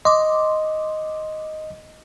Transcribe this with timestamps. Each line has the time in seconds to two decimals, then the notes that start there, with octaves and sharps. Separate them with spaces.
0.05 D#5 C6 D6